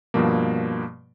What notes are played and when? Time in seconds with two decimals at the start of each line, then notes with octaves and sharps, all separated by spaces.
0.14 G2 B2 F3 A#3